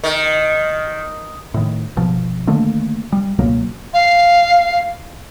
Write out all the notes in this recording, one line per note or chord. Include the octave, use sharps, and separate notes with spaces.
D#3
A2 D#3
G1 B2 F3
D3 D#3 A3 A#3
G3
C#2 B2 F#3 A#3
F5